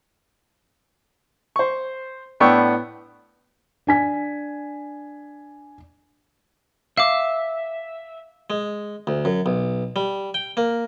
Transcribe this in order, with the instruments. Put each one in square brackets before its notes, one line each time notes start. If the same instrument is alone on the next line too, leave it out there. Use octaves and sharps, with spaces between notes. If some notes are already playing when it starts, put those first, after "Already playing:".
[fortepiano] C5 C#6
A2 B3 D4 G5 C#6 E6
[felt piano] D4 G#5 B6
[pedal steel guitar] E5 [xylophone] F5 D6
[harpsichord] G#3
D2
F#2
B1
G3
G5
A#3